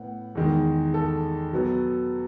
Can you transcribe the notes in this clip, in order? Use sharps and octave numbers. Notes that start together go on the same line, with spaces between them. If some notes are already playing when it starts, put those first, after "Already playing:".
Already playing: A2 B3 F#5
E2 D#3 G#3
A4
B2 F#3 B3